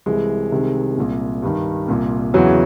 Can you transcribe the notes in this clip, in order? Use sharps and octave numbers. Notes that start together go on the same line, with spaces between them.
C2 C3 E3 G#3
C2 C3 D#3
C2 A#2
G2 D#3
C2 A#2
E2 C#3 E3 F#3